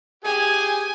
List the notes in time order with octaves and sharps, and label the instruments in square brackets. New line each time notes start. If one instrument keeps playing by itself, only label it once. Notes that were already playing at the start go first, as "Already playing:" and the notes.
[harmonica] G4 G#4 [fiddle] G#5